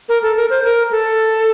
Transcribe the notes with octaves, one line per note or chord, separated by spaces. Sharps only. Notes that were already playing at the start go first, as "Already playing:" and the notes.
A#4
A4
A#4
C5
A#4
A4